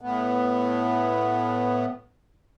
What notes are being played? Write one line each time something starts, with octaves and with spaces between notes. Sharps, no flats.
A2 B3